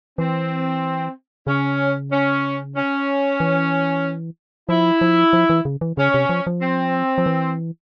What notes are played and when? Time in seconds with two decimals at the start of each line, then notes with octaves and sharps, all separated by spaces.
0.18 E3 C4
1.47 C#3 C#4
2.11 C#4
2.76 C#4
3.40 E3
4.69 F3 E4
5.01 F3
5.33 F3
5.50 E3
5.65 C#3
5.81 E3
5.97 C#3 C#4
6.14 C3
6.29 F3
6.47 F3
6.62 C4
7.18 F3
7.26 E3